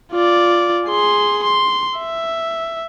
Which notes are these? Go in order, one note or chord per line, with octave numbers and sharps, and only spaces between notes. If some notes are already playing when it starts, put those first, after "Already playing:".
F4 D5
G#4 C6
C6
E5